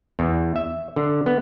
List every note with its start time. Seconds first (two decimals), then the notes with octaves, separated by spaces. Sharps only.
0.19 E2
0.56 E5
0.96 D3
1.26 B3